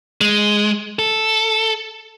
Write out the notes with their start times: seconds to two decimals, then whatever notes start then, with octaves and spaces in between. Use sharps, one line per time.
0.21 G#3
0.99 A4